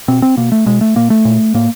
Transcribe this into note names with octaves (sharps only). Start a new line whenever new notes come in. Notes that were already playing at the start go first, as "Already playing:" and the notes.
B2 C4
C4
B2 A#3
A3
B2 G#3
A3
A#2 A#3
A3
A#2
A2 A#3